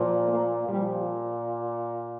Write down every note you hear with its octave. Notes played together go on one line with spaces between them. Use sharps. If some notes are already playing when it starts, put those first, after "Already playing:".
Already playing: A#2 F3
A#3
A#2 F3 G3